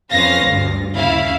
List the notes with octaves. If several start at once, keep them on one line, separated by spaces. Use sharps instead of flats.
F2 C#4 B4 C5 F5 A#6
D2 G2
D#2 C#3 E4 F5